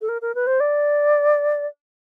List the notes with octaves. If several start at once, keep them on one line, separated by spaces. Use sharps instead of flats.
A4
A#4
A#4
B4
C5
D5